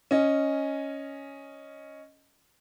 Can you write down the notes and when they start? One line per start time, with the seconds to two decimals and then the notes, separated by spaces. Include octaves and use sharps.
0.11 C#4 D#5